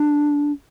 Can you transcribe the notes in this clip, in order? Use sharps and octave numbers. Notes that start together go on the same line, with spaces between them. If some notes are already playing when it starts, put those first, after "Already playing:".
Already playing: D4